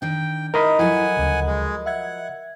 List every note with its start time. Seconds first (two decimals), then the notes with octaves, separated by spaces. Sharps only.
0.02 D#3 D4 G5
0.54 D#4 E4 A#4 D#5 B5
0.79 F3 F#3 E4 A4 F#5 G#5
1.17 D2 C#3
1.47 G#3
1.86 E5 F#5 G#6